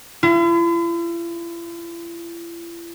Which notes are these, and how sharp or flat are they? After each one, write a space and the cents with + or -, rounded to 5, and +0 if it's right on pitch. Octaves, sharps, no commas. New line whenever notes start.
E4 +45